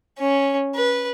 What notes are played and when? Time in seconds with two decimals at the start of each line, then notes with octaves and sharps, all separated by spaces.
0.19 C#4
0.75 B4